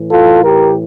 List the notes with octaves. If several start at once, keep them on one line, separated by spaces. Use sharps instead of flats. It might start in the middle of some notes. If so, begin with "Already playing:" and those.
Already playing: A2 E3
F4 A4
G4 A#4